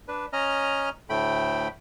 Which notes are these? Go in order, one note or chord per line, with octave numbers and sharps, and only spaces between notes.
D4 B4
C#4 D#5 A#5 F6
D2 A2 A3 G5 B5